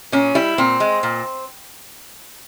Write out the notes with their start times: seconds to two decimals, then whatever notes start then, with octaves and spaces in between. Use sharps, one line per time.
0.12 A#2 C#4
0.35 G3 E4
0.58 A#2 C4
0.80 G#3
1.03 A#2